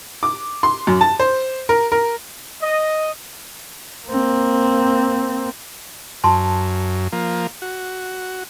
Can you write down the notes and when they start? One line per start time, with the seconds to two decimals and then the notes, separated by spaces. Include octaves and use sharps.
0.23 D6
0.63 C6
0.87 F#2
1.01 A5
1.20 C5
1.69 A#4
1.92 A#4
2.61 D#5
4.07 A#3 C4
6.24 F#2 A5 C6
7.12 F3 A#3
7.62 F#4